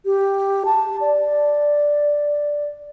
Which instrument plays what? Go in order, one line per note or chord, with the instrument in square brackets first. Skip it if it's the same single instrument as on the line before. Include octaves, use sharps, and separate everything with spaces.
[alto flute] G4
A5
D5